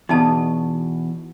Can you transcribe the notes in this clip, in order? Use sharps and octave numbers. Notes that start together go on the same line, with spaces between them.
E2 B2 D#4 A5